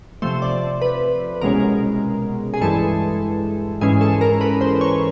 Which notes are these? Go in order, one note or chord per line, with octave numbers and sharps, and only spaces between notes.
C3 F3 A3 C5
D5
B4
C2 B2 G#3 C#4 A#4
G#4
G2 E3 G#3 A4
G#2 E3 G#3 C#4 G#4
A4
A#4
B4
C5
C#5